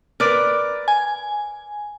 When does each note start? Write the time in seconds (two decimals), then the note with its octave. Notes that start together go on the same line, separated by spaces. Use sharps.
0.20 A#4 B4 D5
0.88 G#5